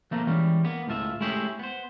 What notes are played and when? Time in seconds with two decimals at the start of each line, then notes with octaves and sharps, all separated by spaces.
0.11 F3 A3 A#3
0.27 E3 G3 G#3 C#4
0.65 A#3 B3
0.88 C#2 A2 F4 E5
1.20 G#3 A3 C#4 E4 G4 G#4
1.59 B3 C5